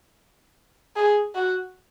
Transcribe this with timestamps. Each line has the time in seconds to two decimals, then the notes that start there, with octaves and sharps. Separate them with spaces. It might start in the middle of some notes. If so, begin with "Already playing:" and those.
0.96 G#4
1.35 F#4